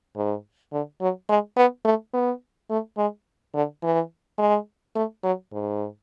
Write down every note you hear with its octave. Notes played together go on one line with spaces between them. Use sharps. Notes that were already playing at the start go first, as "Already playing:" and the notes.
G#2
D3
F#3
G#3
B3
A3
B3
A3
G#3
D3
E3
G#3
A3
F#3
G#2